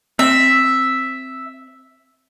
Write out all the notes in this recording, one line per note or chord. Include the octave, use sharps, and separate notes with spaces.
C4 E5